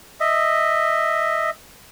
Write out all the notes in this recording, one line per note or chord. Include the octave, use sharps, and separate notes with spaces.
D#5 E5